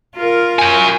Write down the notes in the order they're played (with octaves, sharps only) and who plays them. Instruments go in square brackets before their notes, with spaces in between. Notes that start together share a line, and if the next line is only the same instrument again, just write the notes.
[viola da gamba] F4 A#4
[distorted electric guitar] F#4 G#5